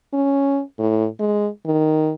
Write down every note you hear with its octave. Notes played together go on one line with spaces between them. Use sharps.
C#4
A2
G#3
D#3